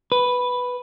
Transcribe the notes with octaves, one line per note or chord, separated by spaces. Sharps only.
B4